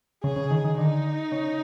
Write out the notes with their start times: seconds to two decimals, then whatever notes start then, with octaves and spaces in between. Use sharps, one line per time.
0.23 C#3 G#4
0.36 C#3
0.51 D#3
0.65 D#3
0.78 D3 D#4
1.32 C#3